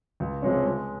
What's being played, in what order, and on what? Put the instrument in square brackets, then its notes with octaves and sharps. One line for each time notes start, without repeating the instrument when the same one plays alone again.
[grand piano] C#2
C3 F3 G#3 C#4
G#3